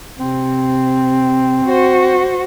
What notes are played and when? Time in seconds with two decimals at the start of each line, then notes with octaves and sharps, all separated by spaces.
0.20 C3 C4
1.64 F#4 C5